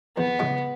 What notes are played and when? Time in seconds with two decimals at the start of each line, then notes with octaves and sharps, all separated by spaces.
0.17 E2 B3
0.39 C#3 E3 G#3 C#4